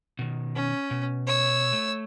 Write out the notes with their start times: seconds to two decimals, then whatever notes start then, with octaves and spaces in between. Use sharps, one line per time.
0.19 B2 D#3
0.55 C#4
0.91 B2
1.27 C#5 E6
1.72 A3